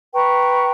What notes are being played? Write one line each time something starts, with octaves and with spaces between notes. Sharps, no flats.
B4 G5 A#5 C#6